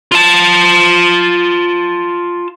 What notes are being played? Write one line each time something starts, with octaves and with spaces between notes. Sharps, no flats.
F4 A5